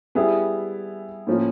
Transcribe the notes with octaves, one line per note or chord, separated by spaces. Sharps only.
G3 B3 E4 G#4
A2 F3 A#3 C#4